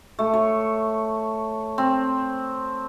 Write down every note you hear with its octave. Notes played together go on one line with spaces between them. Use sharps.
A3
C#5
C4